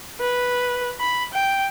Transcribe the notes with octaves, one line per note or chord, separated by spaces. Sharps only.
B4
B5
G5